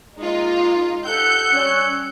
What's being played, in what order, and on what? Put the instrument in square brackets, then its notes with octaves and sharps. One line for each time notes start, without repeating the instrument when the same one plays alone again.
[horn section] G#3 A#3 [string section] D#4 F4
[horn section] G4 A4 F#5 [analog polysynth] E6 F#6 C#7 [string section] G6
[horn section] G3 C#5 [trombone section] C#4